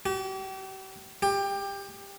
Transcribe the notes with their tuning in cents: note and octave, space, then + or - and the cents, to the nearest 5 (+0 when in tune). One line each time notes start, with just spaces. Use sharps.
G4 -40
G4 +20